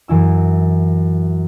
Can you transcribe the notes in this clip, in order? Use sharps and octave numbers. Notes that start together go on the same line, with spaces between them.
F#2 E3 E4 E6